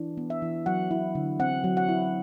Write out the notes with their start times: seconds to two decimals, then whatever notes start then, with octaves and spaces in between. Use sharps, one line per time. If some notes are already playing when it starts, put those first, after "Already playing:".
Already playing: E3 D4
0.17 B3
0.30 E5
0.42 E3
0.66 F#3 F#5
0.91 E4
1.15 D3
1.40 C4 F#5
1.64 F#3
1.77 F#5
1.89 E4